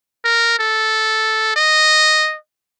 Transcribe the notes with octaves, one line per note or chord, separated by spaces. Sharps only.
A#4
A4
D#5